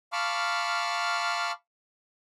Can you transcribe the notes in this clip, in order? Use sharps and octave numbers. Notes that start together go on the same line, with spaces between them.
F5 A5 B5 C#6 D6 F6